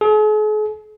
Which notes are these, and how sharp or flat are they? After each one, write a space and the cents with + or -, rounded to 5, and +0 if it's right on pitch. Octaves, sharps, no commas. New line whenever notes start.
G#4 +45